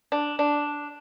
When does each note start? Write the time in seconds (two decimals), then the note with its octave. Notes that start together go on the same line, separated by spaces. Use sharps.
0.12 D4
0.39 D4